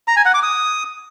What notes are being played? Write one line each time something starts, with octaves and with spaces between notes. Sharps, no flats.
A#5
G#5
F#5
D6
D#6